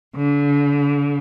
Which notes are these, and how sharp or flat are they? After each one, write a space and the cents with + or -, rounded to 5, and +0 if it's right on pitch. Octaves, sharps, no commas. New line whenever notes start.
D3 -40